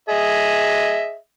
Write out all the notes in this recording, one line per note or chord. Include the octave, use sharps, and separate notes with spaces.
G#4 D#5 E5